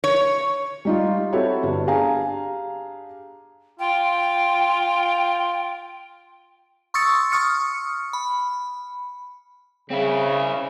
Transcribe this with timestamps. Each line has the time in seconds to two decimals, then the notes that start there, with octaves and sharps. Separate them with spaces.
0.04 C#5
0.85 G3 D#4 F4
1.33 C4 E4 F#4 G4 A4 C#5
1.63 G1 D4
1.87 D4 G4 G#4 F5 G#5 A#5
3.79 F4 G5
6.94 C6 C#6 D#6 E6 A6 C#7
7.32 C#6 D#6 F6 C#7
8.13 B5
9.90 C#3 C4 E4